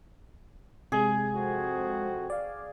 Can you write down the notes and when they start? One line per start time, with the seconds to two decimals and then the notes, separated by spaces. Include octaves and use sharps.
0.92 C3 G#3 G#4
1.35 F2 C4 F#4
2.30 D5 F5